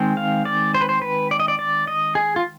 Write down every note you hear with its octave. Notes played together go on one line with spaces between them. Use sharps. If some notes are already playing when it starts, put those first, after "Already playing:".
Already playing: D#3 G#3 C4
F5
D5
C5
B4
C5
B4
D5
D#5
D5
D5
D#5
G#4
F4